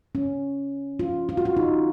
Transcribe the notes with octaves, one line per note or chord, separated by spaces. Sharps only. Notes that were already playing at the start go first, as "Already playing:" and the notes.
C#4
F4
F4
F#4
F4
D#4